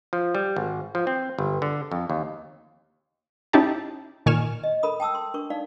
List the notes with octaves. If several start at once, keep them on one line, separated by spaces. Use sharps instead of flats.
F3
G3
G#1
F3
C4
G1
D3
F2
D#2
C#4 D#4 E4 G4 A5
A#2 D#3 G#5 C#6 F6 E7
D#5
A4 A#4 B5 D#6
G5 A5 D#6 E6
C6
D4 A#4 C#6
D#4 D5 F5